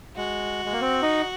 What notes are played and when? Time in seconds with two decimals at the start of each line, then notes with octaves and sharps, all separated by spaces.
0.16 G#3 F#4
0.65 G#3
0.73 A#3
0.81 C4
1.02 D#4